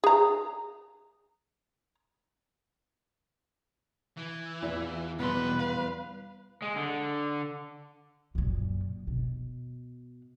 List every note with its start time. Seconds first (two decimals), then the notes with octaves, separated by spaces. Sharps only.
0.04 G#4 A#5
4.17 E3
4.63 E2 E4 F4
5.19 B2 G3 B3 B4 C6
5.59 F5
6.62 G#3
6.76 D3
8.35 F#2 A#2
9.07 B2